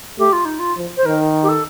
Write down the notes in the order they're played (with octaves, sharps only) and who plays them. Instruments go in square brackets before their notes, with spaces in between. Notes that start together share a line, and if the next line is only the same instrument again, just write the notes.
[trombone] A3 [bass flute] G4
[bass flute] F4
D#4
F4
[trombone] F3
[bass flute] C5
[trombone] D#3 [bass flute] A#4
[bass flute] G4
A4